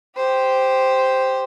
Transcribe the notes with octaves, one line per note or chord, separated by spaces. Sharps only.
G4 C5